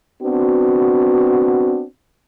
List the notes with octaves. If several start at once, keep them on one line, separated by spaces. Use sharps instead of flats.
B3 C4 D4 F#4